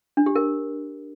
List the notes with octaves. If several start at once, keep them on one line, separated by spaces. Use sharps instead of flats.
D4
G4
A#4